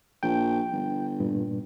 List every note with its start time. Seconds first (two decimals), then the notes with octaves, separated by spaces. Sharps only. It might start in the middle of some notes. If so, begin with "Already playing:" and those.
0.23 A#1 G5
0.72 G1
1.20 G2 A#2